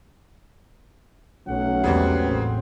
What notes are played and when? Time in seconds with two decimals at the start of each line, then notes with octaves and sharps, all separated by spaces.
1.48 B1 F#3 A3 C#4 F#5
1.84 E2 C#3 G3 A#3 C4
2.21 A1 C4